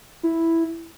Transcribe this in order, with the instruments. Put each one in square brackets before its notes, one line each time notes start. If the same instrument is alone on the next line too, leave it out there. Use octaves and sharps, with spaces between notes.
[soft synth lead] E4